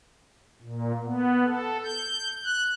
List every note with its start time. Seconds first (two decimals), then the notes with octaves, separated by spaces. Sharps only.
0.62 A#2
1.04 B3
1.45 A4
1.84 G6
2.44 F#6